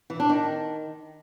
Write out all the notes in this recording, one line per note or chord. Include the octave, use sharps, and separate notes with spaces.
E3
D4
D#3